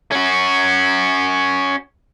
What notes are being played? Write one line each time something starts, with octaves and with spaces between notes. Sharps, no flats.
C#4 F#4